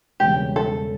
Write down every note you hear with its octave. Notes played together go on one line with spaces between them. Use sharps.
E1 E2 C#3 G3 G4
A4